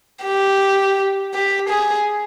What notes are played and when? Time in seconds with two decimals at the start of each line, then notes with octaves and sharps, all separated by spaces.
0.24 G4
1.34 G4
1.69 G#4